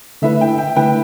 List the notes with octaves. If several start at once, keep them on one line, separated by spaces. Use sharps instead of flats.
D3 A3 E4 B4 E5
G5
G5
D3 A3 E4 B4 G5